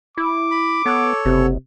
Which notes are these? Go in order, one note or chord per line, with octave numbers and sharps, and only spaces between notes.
E4 D6
B5
B3 A4 C#5
F#1 C3